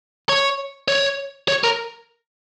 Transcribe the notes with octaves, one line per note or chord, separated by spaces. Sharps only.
C#5
C#5
C#5
A#4